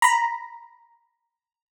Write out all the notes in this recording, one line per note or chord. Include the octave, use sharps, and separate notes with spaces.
A#5 B5